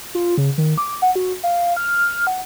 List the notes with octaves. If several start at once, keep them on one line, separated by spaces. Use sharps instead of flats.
F4
C#3
D#3
D6
F#5
F#4
F5
F6
F#5